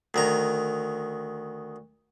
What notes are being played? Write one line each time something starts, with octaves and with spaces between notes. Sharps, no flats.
D2 D#3 A#5